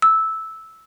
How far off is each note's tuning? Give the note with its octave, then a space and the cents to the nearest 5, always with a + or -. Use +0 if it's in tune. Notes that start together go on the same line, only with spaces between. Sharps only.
E6 -10